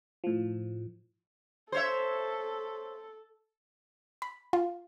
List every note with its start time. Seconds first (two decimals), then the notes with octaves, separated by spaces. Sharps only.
0.24 A2 F3
1.72 A4 C5 C#5 E5
4.22 B5
4.53 F4